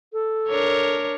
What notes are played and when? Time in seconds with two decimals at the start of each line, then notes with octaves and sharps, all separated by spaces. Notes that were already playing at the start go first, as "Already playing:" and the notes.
0.13 A4
0.48 D4 A#4 C#5